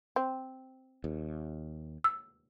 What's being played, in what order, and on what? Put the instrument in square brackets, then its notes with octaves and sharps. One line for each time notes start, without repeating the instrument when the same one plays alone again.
[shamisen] C4
[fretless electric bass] D#2
[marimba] E6